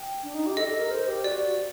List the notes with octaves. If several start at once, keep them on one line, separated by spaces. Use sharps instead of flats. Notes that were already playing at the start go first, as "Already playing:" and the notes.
Already playing: G5
D4
D#4
G4
A4 D#5
A4
A#4
C5
G4
F#4 D5